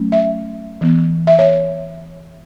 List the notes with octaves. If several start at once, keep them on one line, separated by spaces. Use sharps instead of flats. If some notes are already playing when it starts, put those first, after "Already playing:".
Already playing: F#3 A3 C#4
E5
E3 B3
E5
C#5